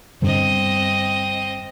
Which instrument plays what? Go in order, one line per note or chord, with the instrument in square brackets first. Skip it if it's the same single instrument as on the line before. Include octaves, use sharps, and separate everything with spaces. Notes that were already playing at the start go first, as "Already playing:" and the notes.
[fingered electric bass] G2 D3 G3 [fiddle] C4 D#5